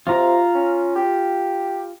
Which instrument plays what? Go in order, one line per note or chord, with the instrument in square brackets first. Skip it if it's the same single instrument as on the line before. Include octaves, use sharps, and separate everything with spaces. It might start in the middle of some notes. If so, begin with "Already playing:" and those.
[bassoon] C3 [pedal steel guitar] F4 A#5
[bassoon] C#4
G4